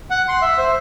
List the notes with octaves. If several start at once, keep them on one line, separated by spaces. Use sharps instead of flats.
F#5
C6
E5
C5